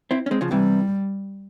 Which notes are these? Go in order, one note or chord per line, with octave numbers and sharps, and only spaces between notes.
C4 E4
C#4
G#3 C4
C#3 F3
C3 E3 G3